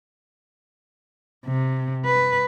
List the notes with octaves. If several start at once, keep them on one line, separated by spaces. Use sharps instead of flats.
C3
B4